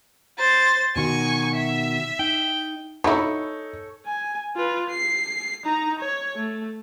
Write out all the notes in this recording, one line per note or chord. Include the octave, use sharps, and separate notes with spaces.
C5 A6
B2 D#3 F#4 G#5 C#6
E5
D#4 G5
F#3 D#4 E4 A4 C#5
G#5
F4 B4
C7
D#4 A#5
C#5
A3